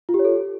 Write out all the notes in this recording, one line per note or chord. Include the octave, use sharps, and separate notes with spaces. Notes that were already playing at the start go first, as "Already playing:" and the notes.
F4
G4
C#5
A4